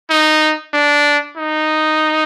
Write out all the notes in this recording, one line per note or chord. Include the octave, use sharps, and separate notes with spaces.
D#4
D4
D#4